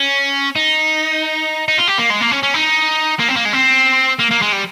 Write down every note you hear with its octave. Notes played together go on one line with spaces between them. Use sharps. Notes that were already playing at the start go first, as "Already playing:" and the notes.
Already playing: C#4
D#4
D#4
F4
G4
A#3
G#3
A#3
C#4
C#4
D#4
A#3
C4
A#3
G#3
C4
A#3
A#3
G#3
G3